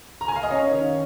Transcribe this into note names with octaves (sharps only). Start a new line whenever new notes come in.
A#5
G#5
F5
D#5
C#4 C#5
D#3